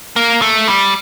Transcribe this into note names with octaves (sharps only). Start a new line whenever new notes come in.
A#3
A3
G3